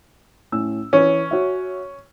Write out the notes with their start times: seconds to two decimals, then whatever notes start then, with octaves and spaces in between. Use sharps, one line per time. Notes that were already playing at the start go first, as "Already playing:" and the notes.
0.52 A2 C#4 E6
0.93 E3 C#4 B4 C#5
1.31 F#4 C#5 E5